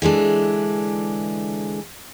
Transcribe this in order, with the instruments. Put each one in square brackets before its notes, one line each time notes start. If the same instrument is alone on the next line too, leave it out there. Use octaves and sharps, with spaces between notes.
[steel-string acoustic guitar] D3 E3 G#3 D4